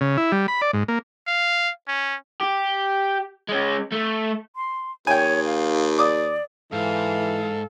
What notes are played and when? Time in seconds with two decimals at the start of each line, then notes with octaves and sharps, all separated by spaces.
0.01 C#3
0.17 E4
0.32 G3
0.48 B5
0.62 D5
0.73 G#2
0.88 A#3
1.27 F5
1.88 C#4
2.41 G4
3.49 G#3 C#4
3.92 A3
4.56 C6
5.07 D#2 C#5 G5 G#5
5.45 F5
5.99 D5 D6 D#6
6.72 G#2 E3 A4 F5